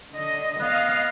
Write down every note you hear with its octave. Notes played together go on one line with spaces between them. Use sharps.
D3 D#5
B3 D#5 F5